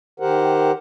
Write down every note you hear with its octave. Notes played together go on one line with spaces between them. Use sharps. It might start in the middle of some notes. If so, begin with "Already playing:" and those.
D#3 G4 A#4 C5 F#5